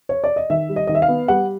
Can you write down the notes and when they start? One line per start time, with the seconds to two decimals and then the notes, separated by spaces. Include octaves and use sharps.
0.09 C#5
0.24 D5
0.36 D#5
0.50 D#3 E5
0.69 G3
0.76 D#5
0.87 D#3 D#5
0.95 E5
1.02 F5
1.08 B3
1.28 G3 F#5